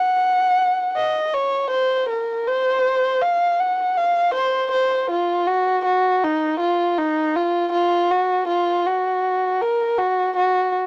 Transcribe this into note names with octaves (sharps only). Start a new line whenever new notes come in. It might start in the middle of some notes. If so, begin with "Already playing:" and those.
Already playing: F#5
D#5
C#5
C5
A#4
C5
F5
F#5
F5
C5
C5
F4
F#4
F#4
D#4
F4
D#4
F4
F4
F#4
F4
F#4
A#4
F#4
F#4